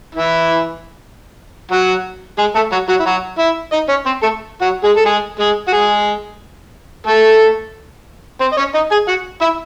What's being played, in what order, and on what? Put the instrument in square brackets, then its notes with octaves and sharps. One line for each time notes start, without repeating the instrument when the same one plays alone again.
[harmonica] E3 E4
F#3 F#4
G#3 G#4
A3 A4
F#3 F#4
F#3 F#4
E4
F#3 F#4
E4 E5
D#4 D#5
C#4 C#5
C4 C5
A3 A4
F#3 F#4
G#3 G#4
A4
G#3 G#4
G#3 G#4
F#4
G#3 G#4
A3 A4
C4 C5
D#5
C#4 C#5
D#4 D#5
G#4 G#5
F#4 F#5
E4 E5